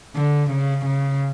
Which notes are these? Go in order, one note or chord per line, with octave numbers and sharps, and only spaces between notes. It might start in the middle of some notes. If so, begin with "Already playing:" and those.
D3
C#3
C#3